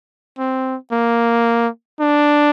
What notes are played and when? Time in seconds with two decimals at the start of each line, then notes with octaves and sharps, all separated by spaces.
0.38 C4
0.92 A#3
2.00 D4